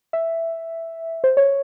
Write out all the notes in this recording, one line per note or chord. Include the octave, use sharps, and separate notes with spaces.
E5
C5
C#5